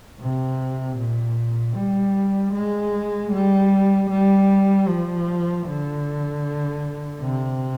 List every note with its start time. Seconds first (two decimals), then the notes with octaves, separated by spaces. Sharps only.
0.20 C3
0.98 A#2
1.76 G3
2.53 G#3
3.32 G3
4.10 G3
4.87 F3
5.66 D3
7.22 C3